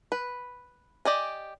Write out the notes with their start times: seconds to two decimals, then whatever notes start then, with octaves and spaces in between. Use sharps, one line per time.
0.12 B4
1.05 G4 D5 D#5 G#5